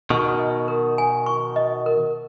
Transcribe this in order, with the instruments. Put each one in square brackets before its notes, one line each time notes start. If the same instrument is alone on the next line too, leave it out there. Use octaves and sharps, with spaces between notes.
[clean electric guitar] B2 D#3 [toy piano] C#6
[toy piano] D#5
A#4
G#5
C#6
D#5
A#4